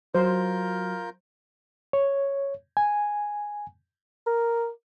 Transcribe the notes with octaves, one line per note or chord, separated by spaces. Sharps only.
F#3 F4 A#4 C5 G6
C#5
G#5
A#4